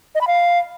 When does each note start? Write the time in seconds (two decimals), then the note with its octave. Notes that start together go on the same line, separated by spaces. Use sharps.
0.15 D#5
0.21 B5
0.27 F5